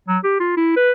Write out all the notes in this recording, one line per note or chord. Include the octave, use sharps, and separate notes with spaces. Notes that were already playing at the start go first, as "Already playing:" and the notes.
F#3
G4
F4
E4
B4